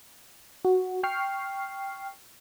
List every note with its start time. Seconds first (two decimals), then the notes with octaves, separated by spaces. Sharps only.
0.65 F#4
1.03 G5 C#6 F6 C7